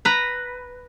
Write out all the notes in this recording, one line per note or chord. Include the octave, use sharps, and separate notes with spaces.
B4 A#5